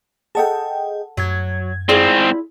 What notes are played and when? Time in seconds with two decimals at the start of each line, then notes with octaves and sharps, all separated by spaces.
0.35 G#4 A4 D#5 F#5 G5 A5
1.17 F#2 F#3 G#6
1.89 G#2 C4 E4 F4 G#4 D5